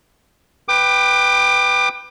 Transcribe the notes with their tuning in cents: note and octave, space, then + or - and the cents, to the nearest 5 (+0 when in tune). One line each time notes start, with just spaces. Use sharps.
B4 +5 G5 +0 D6 +30